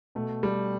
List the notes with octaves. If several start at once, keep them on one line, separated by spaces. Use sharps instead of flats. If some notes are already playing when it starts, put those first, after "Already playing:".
B2 A3
G3